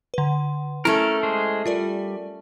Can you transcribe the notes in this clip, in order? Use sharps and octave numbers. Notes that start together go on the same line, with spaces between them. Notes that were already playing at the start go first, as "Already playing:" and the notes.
D3 B4
A3 C#4 E4 A4 A#4
G#3 G#4 C5
G3 F4 A#4 D5